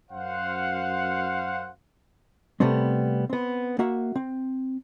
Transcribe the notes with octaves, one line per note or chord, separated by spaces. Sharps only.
F#2 C5 F5 F#5
C3 G3 A3 B3 C4
B3 C4
A#3 F#4 E5 F#5
C4